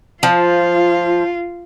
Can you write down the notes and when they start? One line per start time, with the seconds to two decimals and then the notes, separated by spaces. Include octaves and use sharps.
0.23 F3 F4